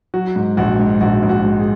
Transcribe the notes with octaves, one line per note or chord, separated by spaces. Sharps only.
F#3 F#4
G#2
A#1 F#4
G#2
A#1 F#4
A#1
F#4
G#2
G#4